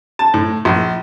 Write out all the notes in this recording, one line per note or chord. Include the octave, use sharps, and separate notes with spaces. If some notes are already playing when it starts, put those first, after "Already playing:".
A5
A2
A#1